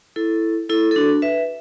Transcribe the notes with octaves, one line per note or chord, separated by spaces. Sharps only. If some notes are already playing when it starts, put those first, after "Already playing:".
E4 A4
E4 A4
A4
D4 F#4
B4 E5